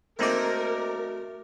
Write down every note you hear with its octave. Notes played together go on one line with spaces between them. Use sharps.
A3 A#3 C4 D#4 F#4 A#4 D5 E5